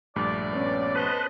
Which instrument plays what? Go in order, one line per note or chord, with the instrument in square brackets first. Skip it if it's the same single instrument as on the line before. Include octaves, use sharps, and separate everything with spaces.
[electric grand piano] A#1 G2 A3 [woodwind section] D5
[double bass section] B3 C#4
[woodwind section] A4 C5 D#5 [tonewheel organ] B4